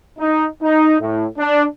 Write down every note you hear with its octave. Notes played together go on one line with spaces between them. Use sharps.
D#4
D#4
A2
D4